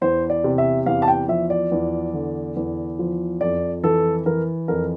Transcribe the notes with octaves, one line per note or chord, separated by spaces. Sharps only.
E2 C5
D5
C3
E5
E2 F5
A5
G5
F3 E5
D5
E2
D3
E2
F3
F2 D5
E3 A4
E3 A#4
F2 A#4